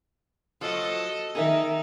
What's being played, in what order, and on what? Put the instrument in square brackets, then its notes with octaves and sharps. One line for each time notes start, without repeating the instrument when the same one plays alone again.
[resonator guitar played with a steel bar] F3 F#3 [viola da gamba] A4 D#5
[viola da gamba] D#3 D#4 [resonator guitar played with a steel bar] G#4 A#4 E5